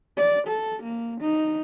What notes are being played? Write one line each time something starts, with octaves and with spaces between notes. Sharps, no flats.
D5
A4
A#3
D#4